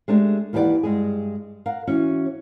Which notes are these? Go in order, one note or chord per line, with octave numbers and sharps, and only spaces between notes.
G#3 A3 D4 G4
D#2 E3 G4 G#4 D5 F#5
G2 G#3 G#4
A#4 F5 F#5
E3 C#4 F#4 C#5